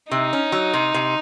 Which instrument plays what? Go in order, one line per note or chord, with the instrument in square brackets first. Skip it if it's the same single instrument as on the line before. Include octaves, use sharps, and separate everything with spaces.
[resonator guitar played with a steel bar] C3 [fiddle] D#4
[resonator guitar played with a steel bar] C#4
F#3
C3
C3